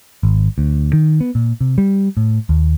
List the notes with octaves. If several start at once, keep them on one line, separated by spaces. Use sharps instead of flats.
G#1
D2
D#3
B3
A#2
C3
G3
A2
D#2